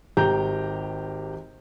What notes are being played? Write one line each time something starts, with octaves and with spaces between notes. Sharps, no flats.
G#1 G4 A#5 G6